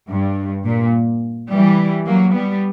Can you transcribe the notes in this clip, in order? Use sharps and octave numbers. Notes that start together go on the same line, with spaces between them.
G2
A#2
E3 G3
F#3 A#3
G3 B3